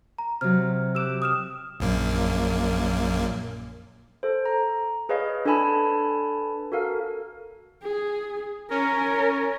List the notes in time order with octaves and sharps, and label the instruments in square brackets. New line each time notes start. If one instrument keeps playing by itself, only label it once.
[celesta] A#5
[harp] C3 F#3 [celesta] F6
[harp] G4 D6 F#6 [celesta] E6 E7
[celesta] D#6 F6 E7
[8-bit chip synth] A#1 F#2 A#3
[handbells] A4 C5
A#5
G#4 B4 C#5 D#5 F5
D4 A4 B4 G#5 A5 B5
F#4 A4 A#4 F5
[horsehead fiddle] G#4
[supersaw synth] C#4 [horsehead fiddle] A#4